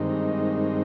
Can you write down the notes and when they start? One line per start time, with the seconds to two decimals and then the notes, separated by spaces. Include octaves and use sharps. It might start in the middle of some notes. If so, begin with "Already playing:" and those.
Already playing: G2 D#3 G#3 C4 D#4